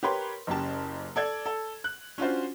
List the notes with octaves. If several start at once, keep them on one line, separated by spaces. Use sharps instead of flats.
G4 A#4 B4 C#5 B5 C6
F#1 C#3 G4 A5
A4 D5 G#6
A4
F#6
C#4 D4 F4 F#4 C5